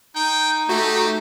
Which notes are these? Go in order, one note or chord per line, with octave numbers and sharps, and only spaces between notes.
D#4 G5
A3 F#4 G4